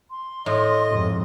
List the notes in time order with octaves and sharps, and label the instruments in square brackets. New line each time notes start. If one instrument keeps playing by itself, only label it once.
[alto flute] C6
[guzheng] A2 [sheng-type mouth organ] D#5
[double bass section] F2 G#2 C3